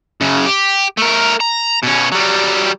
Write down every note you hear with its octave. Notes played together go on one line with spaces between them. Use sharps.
F#2 C#3
G4
A3 A#4
A#5
B2 C#4
F#3 G3